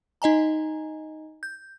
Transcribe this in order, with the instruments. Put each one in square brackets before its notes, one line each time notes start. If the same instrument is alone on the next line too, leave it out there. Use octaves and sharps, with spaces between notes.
[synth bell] D#4 D#5 G#5 A#5
G6